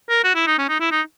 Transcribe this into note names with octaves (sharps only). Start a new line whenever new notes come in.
A#4
F#4
E4
D#4
C#4
D#4
E4
D#4